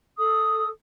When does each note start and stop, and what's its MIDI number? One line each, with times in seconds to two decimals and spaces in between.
0.18 0.68 69
0.18 0.68 87